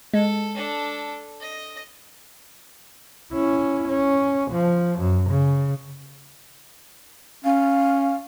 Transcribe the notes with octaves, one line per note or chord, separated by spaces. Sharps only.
G#3 A4
D4 A4
D#5
C#4 E4
C#4
F3
F#2
C#3
C#4 F5